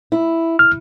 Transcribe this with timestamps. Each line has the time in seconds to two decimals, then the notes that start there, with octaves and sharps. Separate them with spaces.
0.12 E4
0.59 F6